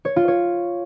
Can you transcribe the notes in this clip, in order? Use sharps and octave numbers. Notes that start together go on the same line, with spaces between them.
C#5
F4
C#5